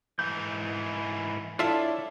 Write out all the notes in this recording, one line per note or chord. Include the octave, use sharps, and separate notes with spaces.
G#2 E3 G6
D4 E4 F4 A4 C#5 D5 E5